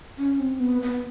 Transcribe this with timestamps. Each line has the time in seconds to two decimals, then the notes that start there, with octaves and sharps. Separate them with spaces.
0.18 C#4
0.40 C4
0.60 B3
0.82 B3